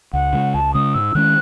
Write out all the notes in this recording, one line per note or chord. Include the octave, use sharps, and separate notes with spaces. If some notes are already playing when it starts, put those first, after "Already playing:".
C#2 F#5
C#3 G#3
C#2 A5
C#3 G#3 D#6
G#2 E6
D#3 G#3 C#4 F#6